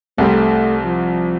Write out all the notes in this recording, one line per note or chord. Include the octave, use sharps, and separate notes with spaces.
C2 C3 G3 A3 C4
F3